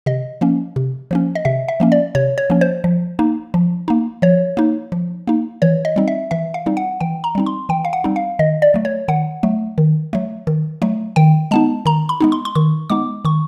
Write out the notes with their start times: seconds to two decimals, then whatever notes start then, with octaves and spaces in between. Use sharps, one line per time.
0.06 C3 D#5
0.41 F3 A#3 C#4
0.76 C3
1.11 F3 A#3 C#4
1.35 D#5
1.45 C3 E5
1.68 E5
1.80 F3 A#3 C#4
1.92 D5
2.15 C3 C#5
2.38 C#5
2.50 F3 A#3 C#4
2.61 C5
2.84 F3
3.19 A#3 D#4
3.54 F3
3.88 A#3 D#4
4.22 F3 C#5
4.57 A#3 D#4
4.92 F3
5.27 A#3 D#4
5.62 E3 C#5
5.85 D#5
5.96 G3 C4 D#4
6.08 E5
6.31 E3 E5
6.54 F5
6.66 G3 C4 D#4
6.77 F#5
7.00 E3 G5
7.24 A#5
7.35 G3 C4 D#4
7.46 C6
7.69 E3 G5
7.85 F5
7.93 F#5
8.04 G3 C4 D#4
8.16 F5
8.39 D#3 D#5
8.62 D5
8.74 F#3 A3
8.85 C#5
9.08 D#3 F#5
9.43 F#3 A3
9.78 D#3
10.13 F#3 A3
10.47 D#3
10.82 F#3 A3
11.16 D#3 G5
11.51 G#3 B3 D#4 A5
11.86 D#3 A#5
12.09 B5
12.20 G#3 B3 D#4
12.32 C6
12.45 C6
12.55 D#3 C#6
12.90 G#3 B3 D#4 D6
13.25 D#3 C#6